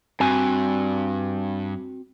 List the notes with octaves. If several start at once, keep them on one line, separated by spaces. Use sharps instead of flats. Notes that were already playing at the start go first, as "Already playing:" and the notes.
G2 C4 F#4 G#5